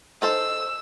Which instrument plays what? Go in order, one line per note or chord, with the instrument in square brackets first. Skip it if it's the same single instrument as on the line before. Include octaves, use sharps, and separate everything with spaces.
[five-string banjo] D#4 A4 C5 [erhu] E6